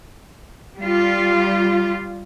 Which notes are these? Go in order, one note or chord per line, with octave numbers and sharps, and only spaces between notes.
G3 F4